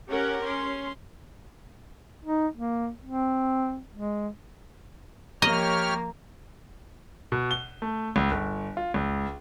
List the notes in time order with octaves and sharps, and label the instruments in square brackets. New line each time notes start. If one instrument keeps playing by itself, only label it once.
[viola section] C#4 G4 A#4 F#5
C#4 C6
[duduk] D#4
A#3
C4
G#3
[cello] F3 A#3 [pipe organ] G4 C#5 F6 [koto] D#5 [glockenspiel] A#5
[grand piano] B2
G7
A3
C#2
G1
F4
C#2